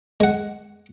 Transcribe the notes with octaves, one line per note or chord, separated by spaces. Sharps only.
G#3 F#5